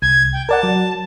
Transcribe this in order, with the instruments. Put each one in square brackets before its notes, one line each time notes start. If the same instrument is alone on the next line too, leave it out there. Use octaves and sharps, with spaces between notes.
[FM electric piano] C2 [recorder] G#6
[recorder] G5
[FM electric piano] A#4 D5 F#5 [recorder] A5
[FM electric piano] F#3